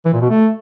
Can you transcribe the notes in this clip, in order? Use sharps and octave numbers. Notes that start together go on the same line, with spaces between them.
E3
A#2
B2
A3